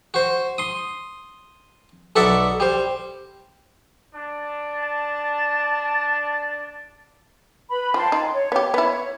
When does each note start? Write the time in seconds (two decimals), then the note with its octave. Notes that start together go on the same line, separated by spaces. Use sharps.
0.14 F#4 C5
0.58 C6 D#6
2.16 B1 A4 D5 E5 F#5
2.60 G3 C5
4.14 D4
4.81 A5
7.70 B4 B5
7.94 F3 G5 A5 C6
8.12 D#4
8.33 C#5
8.52 B3 G4 C#5
8.74 B3 E4